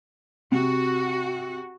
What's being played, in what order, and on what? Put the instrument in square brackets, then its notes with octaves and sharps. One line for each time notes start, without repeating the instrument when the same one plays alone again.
[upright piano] C3 [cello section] F#4